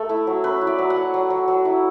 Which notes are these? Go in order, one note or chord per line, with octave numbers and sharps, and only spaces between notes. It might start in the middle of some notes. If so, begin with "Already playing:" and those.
Already playing: A3 A4
E4
F#3
C#4 B4
E4
D5
F#3
F#5
F#3
F#3
F#3
F#3
E4